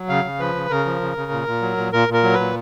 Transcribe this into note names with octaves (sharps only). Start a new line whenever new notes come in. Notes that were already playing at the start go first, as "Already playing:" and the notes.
Already playing: F#3
C#3 F5
C#3
F3 B4
C#3
C#3 A#4
F3
C#3
C#3
A#2
A#2
F#3
A#2
A#2 A#4
A#2 A#4
F#3
A#2 B4